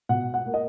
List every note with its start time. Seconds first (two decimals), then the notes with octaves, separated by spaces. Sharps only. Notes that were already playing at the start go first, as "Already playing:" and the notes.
0.09 B2 F#5
0.34 F#5
0.46 A#3
0.54 D#5